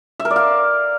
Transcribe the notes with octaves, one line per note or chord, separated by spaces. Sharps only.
E5
A#4
D5
F5